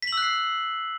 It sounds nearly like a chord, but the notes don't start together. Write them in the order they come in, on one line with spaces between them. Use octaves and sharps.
B6 F#7 E6 F#6 C7